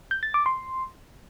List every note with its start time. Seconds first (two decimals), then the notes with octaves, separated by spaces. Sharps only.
0.11 G6
0.23 A6
0.34 D6
0.46 C6